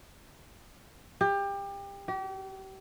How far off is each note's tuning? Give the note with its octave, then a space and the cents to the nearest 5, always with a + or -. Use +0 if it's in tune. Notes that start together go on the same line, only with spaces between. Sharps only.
G4 +25
G4 -35